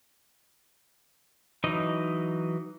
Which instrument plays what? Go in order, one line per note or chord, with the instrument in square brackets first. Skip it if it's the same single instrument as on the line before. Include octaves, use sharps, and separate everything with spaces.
[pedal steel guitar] E3 F#3 D#4 D#5